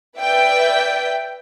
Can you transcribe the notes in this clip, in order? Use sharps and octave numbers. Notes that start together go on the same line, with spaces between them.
B4 D5 E5 G5